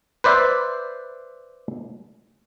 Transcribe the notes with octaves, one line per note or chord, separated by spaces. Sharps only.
B4 C5 D5 E5